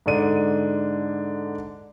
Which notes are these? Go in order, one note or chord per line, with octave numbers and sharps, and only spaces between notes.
G#2 D3 D4 D#7